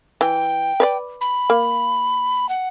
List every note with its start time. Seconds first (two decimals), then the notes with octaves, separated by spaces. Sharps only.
0.21 E3 G5
0.80 B4 C#5 D5
1.21 B5
1.50 A#3
2.49 F#5